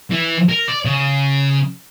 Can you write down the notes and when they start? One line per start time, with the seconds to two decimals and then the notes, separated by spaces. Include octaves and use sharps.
0.11 E3
0.49 A#4
0.68 D5
0.85 C#3